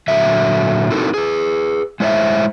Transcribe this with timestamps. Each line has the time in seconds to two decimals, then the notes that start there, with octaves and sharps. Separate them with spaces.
0.08 A#2 D3 F#3 E5
0.90 C4 D#4 E4 F#4 A4 A#4
1.14 G#4 B4
2.00 G#3 E4 C5 C#5 E5